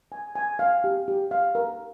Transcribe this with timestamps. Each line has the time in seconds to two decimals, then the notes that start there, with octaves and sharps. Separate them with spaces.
0.12 G#5
0.36 G#5
0.59 F5
0.84 G4
1.08 G4
1.31 F5
1.55 A#4